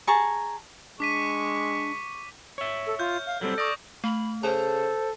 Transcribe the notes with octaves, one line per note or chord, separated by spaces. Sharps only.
G#4 A5 A#5 C#6
G#3 D4 C#6 D6 B6 D#7
C#5 E5
A4
F4 F6 G6
F5
F#3 G3 C4 A4
D5 C#6 D#6 A#6
A3 B5
C#3 A4 C5 A5